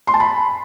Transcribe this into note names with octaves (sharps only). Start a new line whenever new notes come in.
C6
A5
B5